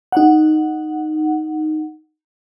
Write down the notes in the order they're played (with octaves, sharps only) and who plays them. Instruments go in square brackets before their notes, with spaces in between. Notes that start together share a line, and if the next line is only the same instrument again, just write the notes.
[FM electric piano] D#4 F#5